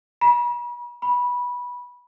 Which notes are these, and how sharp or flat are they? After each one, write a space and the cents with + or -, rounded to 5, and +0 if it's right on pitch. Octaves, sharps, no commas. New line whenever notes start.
B5 -45
B5 -15